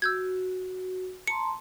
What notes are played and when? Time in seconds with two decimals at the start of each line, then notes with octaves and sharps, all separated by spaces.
0.02 F#4 E6 G6 G#6
1.27 A5 A#5 C6 C#7